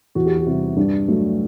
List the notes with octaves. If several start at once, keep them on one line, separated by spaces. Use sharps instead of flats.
E2 F#4
G4
F#4
C3 G3 E4
G2 D4
F#3 A3